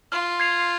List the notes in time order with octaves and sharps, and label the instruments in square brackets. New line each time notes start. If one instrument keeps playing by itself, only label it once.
[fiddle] F4 [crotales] F6
[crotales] G#6 C7 F7